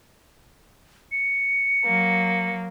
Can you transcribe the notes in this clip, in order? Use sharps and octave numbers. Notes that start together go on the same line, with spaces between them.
C#7
F#3 A#3